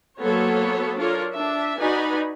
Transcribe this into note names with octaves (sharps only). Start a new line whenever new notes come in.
F#3 A#3 B3 A4 C5 C#5
D4 F4 A4 A#4 C#5
D4 E5
D#4 F#4 B4 D5 G#5 B5